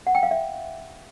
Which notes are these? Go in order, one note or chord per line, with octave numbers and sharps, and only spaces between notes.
F#5
G5
F5
E5